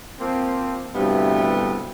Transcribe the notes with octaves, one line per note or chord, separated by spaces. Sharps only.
F3 A#3 C4
D2 G2 C3 E3 B3